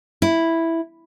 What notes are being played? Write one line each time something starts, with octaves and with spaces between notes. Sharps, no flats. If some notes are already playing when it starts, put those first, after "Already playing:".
E4